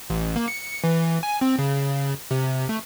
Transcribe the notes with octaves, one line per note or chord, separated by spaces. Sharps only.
A1
A#3
C#7
E3
G#5
C4
C#3
C3
A3